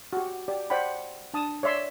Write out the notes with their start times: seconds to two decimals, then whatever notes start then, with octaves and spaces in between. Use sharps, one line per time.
0.13 F#4 G4
0.48 G4 D5
0.70 C5 D5 F#5 G5 B5
1.34 D4 A5 D#6
1.63 C#5 D5 E5 C6